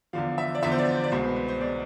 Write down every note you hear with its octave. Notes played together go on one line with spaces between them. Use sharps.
E2 D3 F3 F5
E5
D5
E2 D3 F3 E5
C5
D5
C5
D5
C2 B2 G#3 C5
B4
B4
C5
B2 G#3 D5